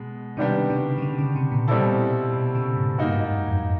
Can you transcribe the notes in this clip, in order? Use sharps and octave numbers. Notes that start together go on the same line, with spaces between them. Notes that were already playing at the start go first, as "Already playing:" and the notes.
Already playing: B2 G#3
C3 D#3 G3 B3 D4 G4
C#3
C#3
D3
C#3
C3
A#2
B2 G3 C4 E4 A4
B2
C#3
G#2
G2 A#3 D#4 F#4
G#2
F#2
F2